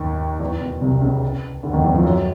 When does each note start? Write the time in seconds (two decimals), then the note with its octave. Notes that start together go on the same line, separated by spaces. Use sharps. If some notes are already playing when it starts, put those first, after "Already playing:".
Already playing: D#2 D#3
0.40 E2 E3
0.61 B2
0.81 C2 C3
1.01 C#2 C#3
1.63 D2 D3
1.73 D#2 D#3
1.84 E2 E3
1.94 F2 F3
2.05 F#2 F#3